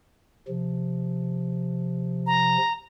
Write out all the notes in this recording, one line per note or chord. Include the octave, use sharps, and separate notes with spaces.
C3 F3
A#5